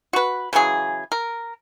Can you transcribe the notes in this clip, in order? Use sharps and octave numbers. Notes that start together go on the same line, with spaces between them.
F#4 B4
C#3 E3 F#3 G#4
A#4